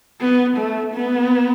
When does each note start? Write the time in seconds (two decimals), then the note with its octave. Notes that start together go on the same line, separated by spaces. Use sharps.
0.21 B3
0.57 A3
0.94 B3